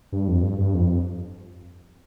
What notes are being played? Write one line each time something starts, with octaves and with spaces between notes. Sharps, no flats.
G2
F2
G2
G2
F2